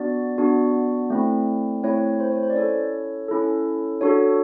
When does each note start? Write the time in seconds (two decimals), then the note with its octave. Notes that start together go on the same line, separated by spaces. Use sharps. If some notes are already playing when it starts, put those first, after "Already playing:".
Already playing: B3 D4 F#4 D5
0.38 B3 D4 F#4
1.10 A3 C4 E4
1.84 A3 C4 E4 C#5
2.20 C5
2.32 C#5
2.43 C5
2.50 D5
2.55 C#4 E4 A4 C#5
3.28 C#4 E4 A4
4.01 D4 F#4 A4 C#5